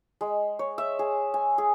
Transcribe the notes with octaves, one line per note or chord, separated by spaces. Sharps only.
G#3
C#5
E5
G#4
G#5
G#4